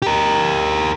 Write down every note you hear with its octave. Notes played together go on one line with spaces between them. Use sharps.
G4 A#4